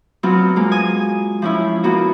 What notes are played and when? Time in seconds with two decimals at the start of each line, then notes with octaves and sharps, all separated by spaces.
0.23 F#3 B3 C4 F4
0.56 G#3 A#3
0.72 G#5 D#6
1.42 F3 C#4 E4
1.84 A#3 B3 F#4